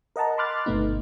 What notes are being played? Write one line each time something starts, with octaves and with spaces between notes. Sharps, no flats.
A#4 D#5 F#5 A5 A#5
B5 C6 D6 F6 F#6 A6
G1 B2 A3 B3 D#4